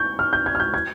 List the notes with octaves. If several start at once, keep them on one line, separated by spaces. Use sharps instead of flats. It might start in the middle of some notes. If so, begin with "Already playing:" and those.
Already playing: C#6 G6
F6
G6
G#6
F6
G6
G#6